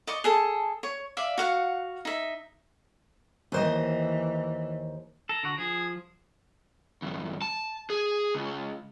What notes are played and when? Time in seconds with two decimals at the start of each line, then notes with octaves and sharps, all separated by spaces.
0.07 D5 D#5 C#6
0.24 G#4 A4 A5
0.83 C#5
1.17 D5 E5 F5
1.38 F#4 F5 F#5
2.05 D#4 E5
3.52 D#2 E3 C5 D#5
5.29 A4 A#5
5.43 D3 F#4
5.58 F3 G#4
7.02 E2 G2
7.42 A5
7.90 G#4
8.35 C#2